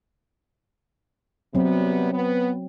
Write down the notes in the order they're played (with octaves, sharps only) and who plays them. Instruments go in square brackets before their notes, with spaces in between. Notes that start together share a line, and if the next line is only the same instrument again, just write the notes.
[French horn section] C3 G3 B3 [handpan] F#3 C4
[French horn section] B3